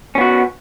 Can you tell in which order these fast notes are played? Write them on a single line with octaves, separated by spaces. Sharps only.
C#4 B3 F#4